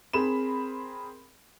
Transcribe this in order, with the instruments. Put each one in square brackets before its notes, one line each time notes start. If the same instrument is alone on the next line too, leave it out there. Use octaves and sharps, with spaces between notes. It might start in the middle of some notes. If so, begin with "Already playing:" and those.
[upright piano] C4 G#4 A#4 B5 E7